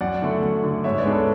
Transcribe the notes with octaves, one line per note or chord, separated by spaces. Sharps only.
F#2 D5 F#5
D3 A3
F#2
D3 A3
G#2 C#5 E5
B4 D5
G#3 B3 D4
A4 C#5